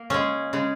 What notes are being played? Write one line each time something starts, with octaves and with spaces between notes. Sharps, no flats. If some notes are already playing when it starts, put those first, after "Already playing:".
Already playing: A#3
C#3 G#3 C#4
C#3 G#3